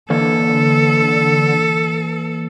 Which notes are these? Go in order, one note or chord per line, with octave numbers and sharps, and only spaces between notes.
D3 E3 A#3 A4 F5